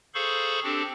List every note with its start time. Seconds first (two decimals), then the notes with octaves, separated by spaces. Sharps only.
0.14 G#4 A4 C5 F5 B5 C#6
0.64 C4 D4 G4 A4